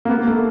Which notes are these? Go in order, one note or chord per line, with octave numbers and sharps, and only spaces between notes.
A#3
B3
A#3
A3